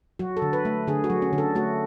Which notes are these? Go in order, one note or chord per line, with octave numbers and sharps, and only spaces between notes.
F#3 F#4
A4
D3
B4
A3
D3 G#4
F#4
F#3
C#4
D3
A4
A3 F#4